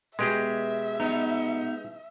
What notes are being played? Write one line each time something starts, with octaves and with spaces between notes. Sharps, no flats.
B2 G#3 G4 G#4 E5
B3 D#4